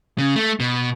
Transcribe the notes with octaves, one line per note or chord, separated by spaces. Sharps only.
C#3
A3
B2